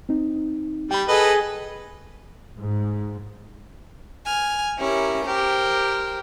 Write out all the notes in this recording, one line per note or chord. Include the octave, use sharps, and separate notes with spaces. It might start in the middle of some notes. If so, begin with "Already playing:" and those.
C4 D#4
G3 G5 B5
G#4 A4 B4 D#5
G#2
G#5 F6
C#4 E4 G4 A#4 A#5
G4 A#4 C5